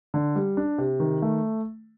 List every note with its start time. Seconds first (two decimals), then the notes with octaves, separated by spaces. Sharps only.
0.14 D3
0.35 G3
0.57 D4
0.78 C3
1.00 D#3
1.22 A3